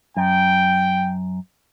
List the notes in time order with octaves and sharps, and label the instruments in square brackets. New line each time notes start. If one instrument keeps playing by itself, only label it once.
[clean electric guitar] F#2 [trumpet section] G5